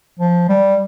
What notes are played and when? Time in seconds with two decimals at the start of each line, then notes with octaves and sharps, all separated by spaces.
0.19 F3
0.49 G3